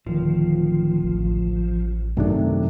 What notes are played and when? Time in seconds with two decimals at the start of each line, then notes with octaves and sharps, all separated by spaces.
0.07 D1 D#3 F3
1.03 A1
2.17 F#2 C3 D#3 F#3 A3 D4